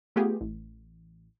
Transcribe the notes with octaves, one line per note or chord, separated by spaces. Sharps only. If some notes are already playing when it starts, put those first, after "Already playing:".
A3 B3 F4 G4 G#4
A1